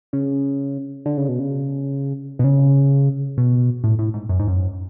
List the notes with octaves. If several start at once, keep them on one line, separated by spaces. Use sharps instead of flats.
C#3
D3
C#3
B2
C#3
B2
C#3
B2
A2
A2
G#2
F#2
G#2
F#2